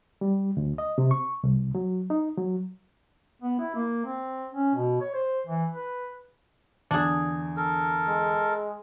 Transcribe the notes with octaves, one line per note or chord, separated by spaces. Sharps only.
G3
D2
D#5
C3
C#6
C2
F#3
D#4
F#3
B3
E4
A#3
C4
C#4
B2
C#5
C5
E3
B4
E2 D3 D4 G#4
A4 A#4
G#3